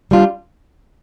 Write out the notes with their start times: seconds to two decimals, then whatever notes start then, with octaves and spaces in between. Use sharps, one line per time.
0.11 G3 D4 F4